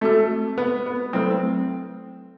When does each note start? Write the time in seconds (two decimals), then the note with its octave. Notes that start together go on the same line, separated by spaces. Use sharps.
0.01 A3 C4 F#4 A4
0.58 B3
0.86 B3
1.13 F#3 A3 C4 E4 A4